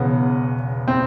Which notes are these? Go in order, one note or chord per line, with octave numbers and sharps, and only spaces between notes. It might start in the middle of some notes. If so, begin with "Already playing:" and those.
Already playing: E1 E2 C#3 B3
C4